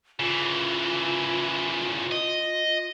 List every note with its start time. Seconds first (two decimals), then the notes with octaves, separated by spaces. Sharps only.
0.20 C#3 E3 F4
2.11 D#5